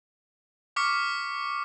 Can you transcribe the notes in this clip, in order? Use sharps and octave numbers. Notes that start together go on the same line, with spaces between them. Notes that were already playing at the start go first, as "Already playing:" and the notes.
C#6 D6 F6 B6 C#7